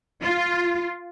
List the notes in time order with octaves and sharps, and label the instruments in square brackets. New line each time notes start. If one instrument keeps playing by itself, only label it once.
[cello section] F4